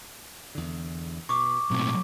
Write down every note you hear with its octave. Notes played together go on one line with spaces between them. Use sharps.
E2 D3
B2 C#6 D6
B1 A2 F#3 C4